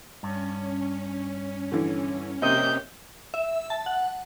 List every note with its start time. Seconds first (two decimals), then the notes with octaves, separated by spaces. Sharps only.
0.23 G2 C#4
1.72 D3 E3
2.42 C3 A#3 C4 C#4 G4 D#5 G6
3.34 E5
3.70 A5
3.86 F#5